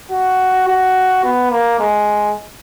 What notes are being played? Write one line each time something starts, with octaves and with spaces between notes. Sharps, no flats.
F#4
F#4
B3
A#3
G#3